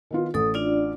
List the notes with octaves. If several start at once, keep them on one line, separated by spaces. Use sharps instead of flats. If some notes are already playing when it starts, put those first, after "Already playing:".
D#3 B3 F4
A1 A4 D#6
D4 F4 D5